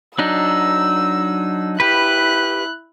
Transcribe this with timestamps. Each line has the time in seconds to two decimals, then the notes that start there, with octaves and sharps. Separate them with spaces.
0.19 F#3 D4 D#4 E6
1.80 E4 G4 B4 F#6